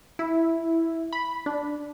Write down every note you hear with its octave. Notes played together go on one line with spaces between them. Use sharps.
E4
B5
D4